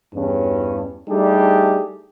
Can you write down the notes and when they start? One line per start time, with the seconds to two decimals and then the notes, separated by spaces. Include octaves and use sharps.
0.14 E2 G2 C#4
1.09 G3 A3 D4 D#4 G4 G#4